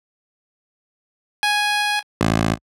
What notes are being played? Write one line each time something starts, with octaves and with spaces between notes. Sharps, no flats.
G#5
A1